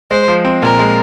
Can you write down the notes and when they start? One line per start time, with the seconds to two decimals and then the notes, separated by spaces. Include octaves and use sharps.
0.11 G#3 C5
0.28 F3
0.45 C4
0.62 A#2 A#4
0.79 G#3